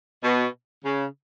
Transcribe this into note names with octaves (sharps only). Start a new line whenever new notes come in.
B2
C#3